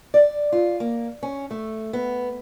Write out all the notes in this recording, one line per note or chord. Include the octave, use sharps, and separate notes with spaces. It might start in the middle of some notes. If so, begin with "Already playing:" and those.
D5
F4
A#3
C#4
A3
B3